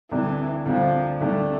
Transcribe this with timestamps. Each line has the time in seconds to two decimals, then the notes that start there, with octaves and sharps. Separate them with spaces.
0.11 D2 C3 E3 G3 D4
0.66 D2 C3 F3 G3 D4
1.20 D2 C3 G3 A3 D4